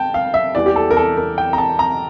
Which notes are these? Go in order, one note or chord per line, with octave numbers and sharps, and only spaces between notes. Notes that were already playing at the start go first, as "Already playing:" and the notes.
Already playing: G5 A5
F5
E5
E2 E3 G3 D5
G4
A4
A#4
A4
A#4
G5
A#5
A5
A#5